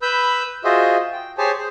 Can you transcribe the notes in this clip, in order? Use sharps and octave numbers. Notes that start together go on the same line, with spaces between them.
B4 B5 E6 G6
F4 F#4 G#4 C5 D#5 E5
G5
G4 G#4 C5 C#5 G#5 A5
G#4 C5